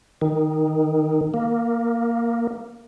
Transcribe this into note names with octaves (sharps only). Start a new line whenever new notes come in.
D#3
A#3